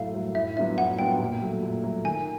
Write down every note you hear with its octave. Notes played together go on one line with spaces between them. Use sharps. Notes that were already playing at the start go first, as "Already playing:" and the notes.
Already playing: A2 F#3 A3 F5
F#3 A3
A2 E5
F#3 B3 D4 F4 E5
A2 F#5
F#3 B3 D4 F4 G5
A#2
F#3 A3
A#2
F#3 A3
D#3 G#5